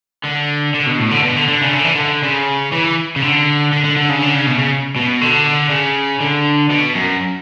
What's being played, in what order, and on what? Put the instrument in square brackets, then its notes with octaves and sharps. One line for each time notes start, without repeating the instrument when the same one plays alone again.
[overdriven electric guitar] D3
D3
B2
A2
D3
B2
D3
D3
C#3
D3
E3
D3
C#3
E3
C#3
D3
D3
D3
D3
C#3
D3
C#3
B2
C#3
B2
D3
C#3
D3
B2
F#2